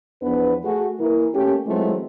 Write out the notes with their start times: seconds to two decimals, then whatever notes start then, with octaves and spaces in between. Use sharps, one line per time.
0.22 E2 F3 B3 D4 B4
0.64 A3 F#4 G#4
0.99 E3 A#3
1.34 A3 A#3 C#4 G4
1.66 E3 F#3 G#3 A3 C4 F4